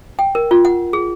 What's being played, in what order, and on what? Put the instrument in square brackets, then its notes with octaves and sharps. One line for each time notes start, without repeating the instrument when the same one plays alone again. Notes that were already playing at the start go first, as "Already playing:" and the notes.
[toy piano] G5
A#4
F4
F#5
G#4